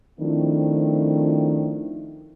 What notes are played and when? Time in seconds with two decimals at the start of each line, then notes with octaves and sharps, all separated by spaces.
0.19 D#3 F3 A3 C4 D4 E4